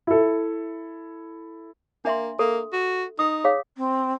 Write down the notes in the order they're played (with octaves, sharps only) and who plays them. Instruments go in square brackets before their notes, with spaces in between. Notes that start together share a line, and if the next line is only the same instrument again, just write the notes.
[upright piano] E4 A4
[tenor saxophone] A#3 [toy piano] D4 E5 C6
[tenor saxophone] A#3 [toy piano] A4
[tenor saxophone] F#4
[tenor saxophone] D#4 [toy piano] D#6
[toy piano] G#4 C#5 F5
[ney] C4